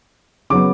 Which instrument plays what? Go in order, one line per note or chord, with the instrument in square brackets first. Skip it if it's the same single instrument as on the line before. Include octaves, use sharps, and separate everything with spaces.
[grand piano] C#3 F#3 B3 D6